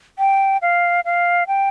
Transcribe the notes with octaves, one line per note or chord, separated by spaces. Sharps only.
G5
F5
F5
G5